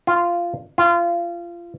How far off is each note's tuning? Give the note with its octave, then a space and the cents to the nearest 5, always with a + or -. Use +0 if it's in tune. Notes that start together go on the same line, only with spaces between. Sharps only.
F4 -10
F4 -25